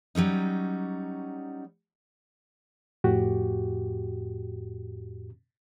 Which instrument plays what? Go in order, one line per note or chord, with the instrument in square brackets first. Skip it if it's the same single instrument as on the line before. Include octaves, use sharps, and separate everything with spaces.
[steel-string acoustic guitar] F#3 G3 C#4 D#4
[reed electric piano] F2 A2 F#4 G4